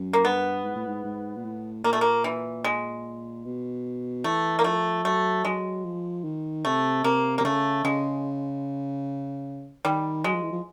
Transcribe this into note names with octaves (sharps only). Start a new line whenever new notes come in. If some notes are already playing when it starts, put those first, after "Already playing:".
Already playing: F#2
A#3
G2 B3
G#2
A2
G#2
G#2
A#2
A2
A#2 A#3
A3
A#3
E3
G#3
B2
E3 A3
A#3
F3 A3
F#3 A3
F#3 G#3
F3
D#3
C3 A3
C3 A#3
C3 A#3
C#3 A3
C#3 G#3
D#3 G3
F#3 G#3
F3
E3
F3